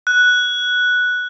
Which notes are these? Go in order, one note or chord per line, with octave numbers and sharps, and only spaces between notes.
F#6